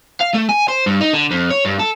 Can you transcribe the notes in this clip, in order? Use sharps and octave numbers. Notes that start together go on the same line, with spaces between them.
F5
A3
G#5
C5
G2
D#4
D3
F2
C#5
G2
A4